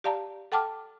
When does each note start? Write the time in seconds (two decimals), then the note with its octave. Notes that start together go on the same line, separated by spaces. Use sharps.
0.04 G4 D5 F5 A5 A#5
0.52 A4 F#5 G5 A5 D6 F6